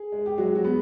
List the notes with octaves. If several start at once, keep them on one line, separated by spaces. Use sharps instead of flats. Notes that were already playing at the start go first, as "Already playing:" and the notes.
Already playing: G#4
G#3
G4
F#3 G#3 F#4
F#3 F#4
B3